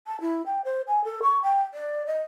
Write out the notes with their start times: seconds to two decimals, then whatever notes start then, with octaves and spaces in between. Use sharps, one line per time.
0.07 A5
0.21 E4
0.46 G5
0.65 C5
0.87 G#5
1.05 A4
1.23 C#6
1.43 G5
1.74 D5
2.06 D#5